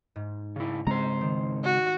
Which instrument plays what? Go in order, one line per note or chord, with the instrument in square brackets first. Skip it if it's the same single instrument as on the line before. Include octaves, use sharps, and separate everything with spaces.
[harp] G#2
[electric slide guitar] C#3 E4
[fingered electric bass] C#3 G#3 C4 [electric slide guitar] C5 A#5
[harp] D#3
[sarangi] F#4